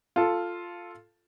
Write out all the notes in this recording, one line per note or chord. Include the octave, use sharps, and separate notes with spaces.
F4 A4